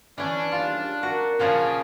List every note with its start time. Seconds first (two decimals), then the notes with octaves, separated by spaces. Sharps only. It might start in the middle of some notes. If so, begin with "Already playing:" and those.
0.18 E3 C#4 D4
0.52 D#2 C#3 G3 F4
1.03 F#4 A#4
1.40 A#2 C#3 F3 G#4